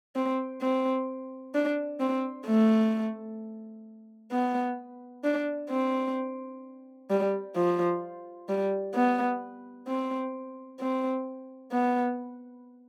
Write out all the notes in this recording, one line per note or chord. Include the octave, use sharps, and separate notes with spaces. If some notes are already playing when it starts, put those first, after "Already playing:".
C4
C4
D4
C4
A3
B3
D4
C4
G3
F3
G3
B3
C4
C4
B3